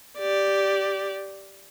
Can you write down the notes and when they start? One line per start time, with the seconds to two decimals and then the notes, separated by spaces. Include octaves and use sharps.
0.19 G4 D5